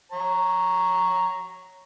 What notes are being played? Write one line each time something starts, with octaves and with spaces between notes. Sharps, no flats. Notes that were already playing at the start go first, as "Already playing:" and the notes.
C#5 A#5